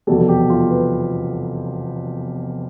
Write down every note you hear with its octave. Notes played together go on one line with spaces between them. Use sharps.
F1 E2 B2 G3 A4
G4
F4
B4